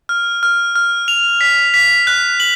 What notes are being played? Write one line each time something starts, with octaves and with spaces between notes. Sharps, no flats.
F6
F6
F6
F7
B6
B6
F#6
F#7